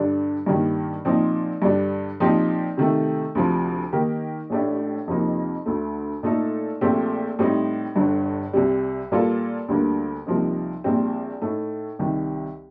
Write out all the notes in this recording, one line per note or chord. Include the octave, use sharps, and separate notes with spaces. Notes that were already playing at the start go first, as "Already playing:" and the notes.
Already playing: G2 D3 G3 D4
G2 D#3 G3 A#3
A#2 F3 C4 D#4
G2 D3 G3 D4
A#2 F3 C4 D#4 G4
C3 D#3 A3
D2 C3 F3
D#3 A#3 D#4 G4 A#4
A1 A2 A3 D4 G4
F2 C3 F3 A#3 D#4
D2 D3 A3
A#2 A3 D#4 A4
A#1 A#2 A3 C4 G4
A2 G3 C4 D#4
G1 G2 D3
C2 C3 G3
A#2 G3 A#3 F4 A4
D2 D3 G3 A#3
C2 C3 F3 A#3 D#4
A#1 A#2 G3 C4
A2 A3 D#4
C2 C3 D#3